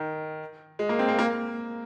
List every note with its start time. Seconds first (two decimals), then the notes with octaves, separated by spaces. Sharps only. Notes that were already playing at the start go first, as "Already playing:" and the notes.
Already playing: D#3
0.79 G#3
0.89 A#3
0.99 C4
1.08 A#3
1.19 A#3